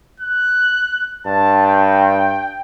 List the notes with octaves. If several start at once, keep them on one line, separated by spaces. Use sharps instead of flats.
F#6
G2 A5
G5